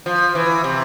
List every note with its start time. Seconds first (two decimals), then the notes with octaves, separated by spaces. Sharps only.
0.06 F3
0.35 E3
0.64 C3